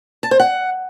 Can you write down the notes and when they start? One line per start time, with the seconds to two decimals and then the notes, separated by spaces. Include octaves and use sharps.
0.23 A5
0.31 C5
0.40 F#5